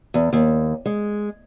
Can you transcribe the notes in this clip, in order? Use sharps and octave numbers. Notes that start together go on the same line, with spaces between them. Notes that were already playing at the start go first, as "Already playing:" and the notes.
E2
D#2
G#3